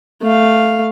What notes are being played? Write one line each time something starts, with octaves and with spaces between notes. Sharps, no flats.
A3 F5